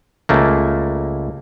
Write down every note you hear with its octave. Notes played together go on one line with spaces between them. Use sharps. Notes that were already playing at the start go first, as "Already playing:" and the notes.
C#2 A3 A#3